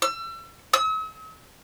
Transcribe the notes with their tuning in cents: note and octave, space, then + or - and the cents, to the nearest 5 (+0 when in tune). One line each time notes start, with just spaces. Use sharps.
E6 +35
E6 -45